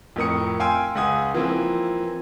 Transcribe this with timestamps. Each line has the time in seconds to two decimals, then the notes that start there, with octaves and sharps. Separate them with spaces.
0.16 F2 A2 A#4 D#6 C#7
0.60 F5 G5 G#5 C6 E6
0.95 C#2 F#5 G#5 D#6
1.34 E3 F3 A#3 C4